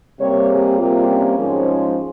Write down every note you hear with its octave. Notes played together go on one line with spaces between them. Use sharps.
C3 G3 A#3 C#5
G#4
C3 G3 A#3 F4
C#4
G#2 F3 G#3